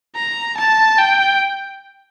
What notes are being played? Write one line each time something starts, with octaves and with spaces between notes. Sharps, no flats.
A#5
A5
G5